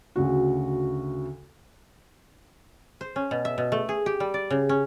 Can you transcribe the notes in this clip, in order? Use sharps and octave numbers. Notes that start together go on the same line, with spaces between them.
D2 C#3 F#4
C5
C#4
B2
E5
B2
A3
G#4
G4
G3
D5
C#3
C#4